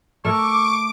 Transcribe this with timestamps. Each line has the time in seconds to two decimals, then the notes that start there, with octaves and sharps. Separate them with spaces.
0.25 A3 A#4 E5 C#6 D6 D7